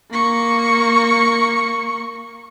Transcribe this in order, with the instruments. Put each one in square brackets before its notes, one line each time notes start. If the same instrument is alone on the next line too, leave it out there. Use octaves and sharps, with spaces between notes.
[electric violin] A#3 C#6